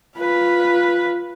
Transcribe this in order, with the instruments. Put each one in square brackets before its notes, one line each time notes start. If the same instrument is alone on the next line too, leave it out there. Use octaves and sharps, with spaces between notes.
[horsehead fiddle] F4 B4